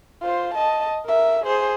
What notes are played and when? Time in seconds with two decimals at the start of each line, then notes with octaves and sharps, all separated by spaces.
0.22 F4 C5
0.54 D#5 A5
1.06 A#4 E5
1.44 G#4 C5